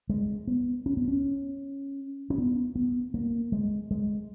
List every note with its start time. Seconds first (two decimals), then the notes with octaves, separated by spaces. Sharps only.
0.09 G#3
0.47 B3
0.86 C#4
0.97 B3
1.08 C#4
2.30 C#4
2.38 B3
2.75 B3
3.14 A#3
3.52 G#3
3.91 G#3